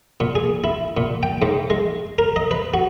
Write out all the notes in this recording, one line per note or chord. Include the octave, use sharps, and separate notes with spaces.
A#2
G#4
E4
A#2
G5
G#2
G#3
A#4
D#5
B4
F#4